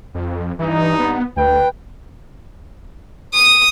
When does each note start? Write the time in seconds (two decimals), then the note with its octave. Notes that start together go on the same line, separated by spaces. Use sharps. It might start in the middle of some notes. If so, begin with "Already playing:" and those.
0.14 F2
0.59 G2 E3 D#4
0.99 B3
1.36 D2 B4 G5
3.35 D#6